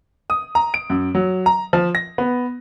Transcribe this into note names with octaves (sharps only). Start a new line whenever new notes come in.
D#6
A#5
D7
F#2
F#3
A#5
F3
A#6
B3